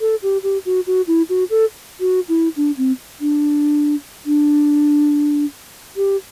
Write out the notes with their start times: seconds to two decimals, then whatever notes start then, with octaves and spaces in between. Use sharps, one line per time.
0.01 A4
0.23 G4
0.43 G4
0.66 F#4
0.87 F#4
1.07 E4
1.29 F#4
1.50 A4
2.00 F#4
2.29 E4
2.56 D4
2.77 C4
3.21 D4
4.26 D4
5.97 G4